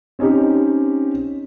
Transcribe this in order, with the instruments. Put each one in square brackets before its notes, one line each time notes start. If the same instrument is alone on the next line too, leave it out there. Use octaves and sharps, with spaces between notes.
[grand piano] C4 C#4 D#4 G4